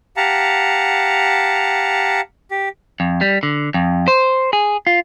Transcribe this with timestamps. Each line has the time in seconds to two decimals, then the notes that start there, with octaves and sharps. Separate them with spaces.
0.17 G4 F5 F#5 A5 A#5
2.51 G4
3.00 F2
3.21 G3
3.43 D3
3.74 F2
4.08 C5
4.53 G#4
4.87 F4